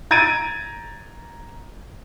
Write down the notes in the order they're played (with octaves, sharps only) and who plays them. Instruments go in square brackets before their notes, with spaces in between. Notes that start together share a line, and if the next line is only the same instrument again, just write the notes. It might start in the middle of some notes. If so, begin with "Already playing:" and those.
[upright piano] A#5 G#6 A6 D7 D#7